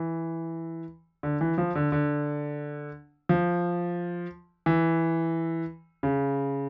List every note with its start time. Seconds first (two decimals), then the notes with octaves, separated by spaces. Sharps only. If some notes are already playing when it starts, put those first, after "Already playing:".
Already playing: E3
1.23 D3
1.41 E3
1.58 F3
1.75 D3
1.92 D3
3.29 F3
4.66 E3
6.03 C#3